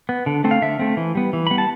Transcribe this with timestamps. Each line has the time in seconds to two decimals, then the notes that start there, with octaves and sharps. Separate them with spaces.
0.09 B3
0.26 D3
0.44 A3 C4
0.51 F5
0.62 D3 E5
0.79 A3 C4
0.97 E3
1.15 G3 B3
1.33 E3
1.47 G3 B3 B5
1.58 A5